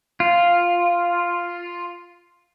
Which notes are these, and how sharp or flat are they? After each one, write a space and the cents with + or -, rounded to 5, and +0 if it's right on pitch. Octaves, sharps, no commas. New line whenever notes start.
F4 +0